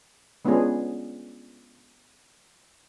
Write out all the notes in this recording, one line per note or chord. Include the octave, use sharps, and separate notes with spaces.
G#3 B3 C#4 D4 F4 G#4